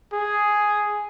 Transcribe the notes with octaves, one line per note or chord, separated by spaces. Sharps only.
G#4